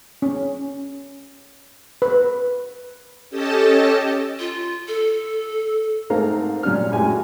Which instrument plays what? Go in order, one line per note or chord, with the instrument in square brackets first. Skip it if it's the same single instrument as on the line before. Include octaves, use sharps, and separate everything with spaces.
[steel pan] C#4
B4
[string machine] C#4 G4 A4 D#5 A5
[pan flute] F4
A4
[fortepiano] G#2 A3 A#3 C4 F5 A#5
A#2 G3 C#4 D4 F6
F#2 A2 G#3 G4 G#5
F#4